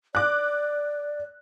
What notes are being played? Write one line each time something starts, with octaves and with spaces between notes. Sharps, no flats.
D5 D6 F#6